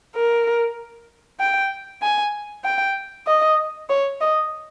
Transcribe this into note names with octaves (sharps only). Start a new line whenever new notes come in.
A#4
G5
G#5
G5
D#5
C#5
D#5